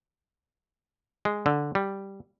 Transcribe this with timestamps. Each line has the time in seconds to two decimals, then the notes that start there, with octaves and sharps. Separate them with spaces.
1.25 G#3
1.46 D3
1.75 G3